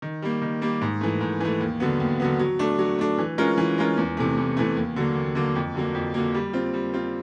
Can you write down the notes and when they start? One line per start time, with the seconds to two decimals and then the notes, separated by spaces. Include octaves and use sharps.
0.02 D#3
0.22 G3 A#3
0.42 D#3
0.61 G3 A#3
0.81 G#2
1.01 E3 A3
1.21 G#2
1.40 E3 A3
1.61 D#2
1.80 D3 F#3 B3
2.00 D#2
2.20 D3 F#3 B3
2.39 F#3
2.59 A3 D4
2.79 F#3
2.99 A3 D4
3.18 E3
3.38 G#3 C#4 F4 A#4
3.58 E3
3.78 G#3 C#4 F4 A#4
3.97 E2
4.17 C3 E3 A3
4.37 E2
4.57 C3 E3 A3
4.77 D#2
4.96 D3 F#3 A#3
5.15 D#2
5.35 D3 F#3 A#3
5.55 F2
5.75 D3 F#3 A#3
5.94 F2
6.14 D3 F#3 A#3
6.34 G3
6.53 C4 F4
6.74 G3
6.94 C4 F4